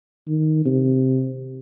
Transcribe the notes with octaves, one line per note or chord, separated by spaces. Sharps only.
D#3
C3